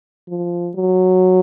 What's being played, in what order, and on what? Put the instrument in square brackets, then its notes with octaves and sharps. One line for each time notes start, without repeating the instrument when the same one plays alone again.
[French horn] F3
F#3